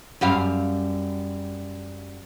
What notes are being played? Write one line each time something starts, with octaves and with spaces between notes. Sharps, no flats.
F#2 G3 F5